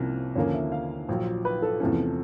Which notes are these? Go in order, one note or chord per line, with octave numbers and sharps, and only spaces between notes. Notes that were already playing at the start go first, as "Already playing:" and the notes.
Already playing: C2 C3 F3 A#3 C#4
D#2 D3 F3 A#3 C#4 C#5
E5
F5
A#1 A#2 F#3
B4
A4
E2 C3 F3 A3 C#4